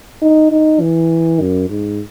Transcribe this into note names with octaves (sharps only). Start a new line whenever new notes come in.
D#4
D#4
E3
F#2
G#2